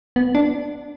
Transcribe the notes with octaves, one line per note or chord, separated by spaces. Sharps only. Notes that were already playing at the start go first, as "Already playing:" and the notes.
B3
D4